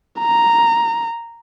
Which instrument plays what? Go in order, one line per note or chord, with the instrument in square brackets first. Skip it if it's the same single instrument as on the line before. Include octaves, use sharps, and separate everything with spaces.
[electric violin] A#5